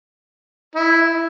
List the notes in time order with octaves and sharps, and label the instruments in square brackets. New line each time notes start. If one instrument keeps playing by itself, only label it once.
[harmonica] E4